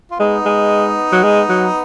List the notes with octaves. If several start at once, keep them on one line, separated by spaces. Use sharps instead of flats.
F4
G#3 B3 D#4
G#3
F#3
G#3
F#3